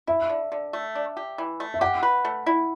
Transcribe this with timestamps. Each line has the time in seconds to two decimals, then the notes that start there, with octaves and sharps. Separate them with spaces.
0.07 E4 E5
0.30 D3
0.52 D3
0.73 A3
0.95 D4
1.17 G4
1.38 E3
1.60 A3
1.74 E5
1.81 G4 F#5
2.03 B4
2.25 A3
2.46 E4